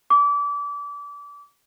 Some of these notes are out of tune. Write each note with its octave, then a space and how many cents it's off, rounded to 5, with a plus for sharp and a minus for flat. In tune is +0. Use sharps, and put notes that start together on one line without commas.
D6 -30